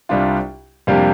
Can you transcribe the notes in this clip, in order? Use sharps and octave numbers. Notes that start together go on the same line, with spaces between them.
C2 C3 G3 D4 F4
F2 C3 G3 A#3 D4